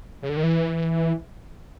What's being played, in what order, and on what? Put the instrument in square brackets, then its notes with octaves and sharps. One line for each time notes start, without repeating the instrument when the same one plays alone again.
[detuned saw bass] C#3
D3
D#3
E3